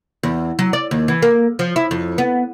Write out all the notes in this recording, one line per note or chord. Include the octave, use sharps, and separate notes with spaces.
E2
F#3
D5
D#2
E3
A#3
F3
E4
F2
B3